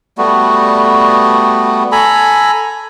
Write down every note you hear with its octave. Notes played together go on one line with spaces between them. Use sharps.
G3 A3 B3 F#4
A4 G#5 A#5 B5